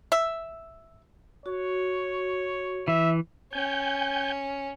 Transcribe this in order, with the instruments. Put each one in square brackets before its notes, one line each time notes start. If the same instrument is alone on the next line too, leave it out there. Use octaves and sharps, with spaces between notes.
[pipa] E5
[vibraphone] F#4 [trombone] C#5
[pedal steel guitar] E3 [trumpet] E5
[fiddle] C#4 [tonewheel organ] G5 G#5 G6